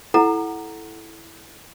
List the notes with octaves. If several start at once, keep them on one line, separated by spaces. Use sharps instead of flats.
E4 A4 F#5 A#5